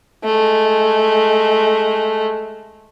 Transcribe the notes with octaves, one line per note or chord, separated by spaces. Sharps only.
G#3 A3